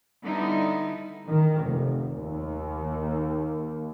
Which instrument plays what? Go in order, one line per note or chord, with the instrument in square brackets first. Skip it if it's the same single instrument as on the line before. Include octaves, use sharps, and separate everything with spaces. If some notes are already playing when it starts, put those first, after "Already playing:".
[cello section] D3 G3 B3 D#4 E4
[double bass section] D#3
F1
D#2